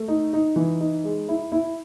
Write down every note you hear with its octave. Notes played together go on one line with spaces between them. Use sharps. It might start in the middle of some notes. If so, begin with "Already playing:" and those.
Already playing: A3
D#4
D#4
E3
D#4
G#3
E4
E4